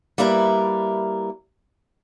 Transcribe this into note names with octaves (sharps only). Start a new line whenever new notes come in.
G3 A#3 E4 A#4 B4